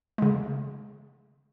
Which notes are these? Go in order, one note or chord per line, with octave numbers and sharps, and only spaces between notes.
C#3 G#3